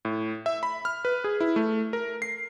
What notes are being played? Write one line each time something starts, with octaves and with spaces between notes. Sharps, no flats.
A2
E5
B5
F6
B4
G#4
E4
A3
A#4
C7